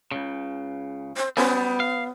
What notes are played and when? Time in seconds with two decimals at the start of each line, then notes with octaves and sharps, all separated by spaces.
0.11 C#2 C#3
1.17 C5
1.37 F#3 G3 B3 C#4 C5
1.80 F5